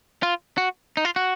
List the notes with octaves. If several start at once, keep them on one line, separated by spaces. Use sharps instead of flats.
F4
F#4
D#4
F4
F#4